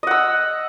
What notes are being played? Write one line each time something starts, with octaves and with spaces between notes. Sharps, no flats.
D#5 F#5 E6